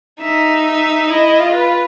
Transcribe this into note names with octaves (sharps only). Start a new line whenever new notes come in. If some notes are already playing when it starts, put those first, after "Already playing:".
D#4 E5
E5
E4 D#5
F4
B4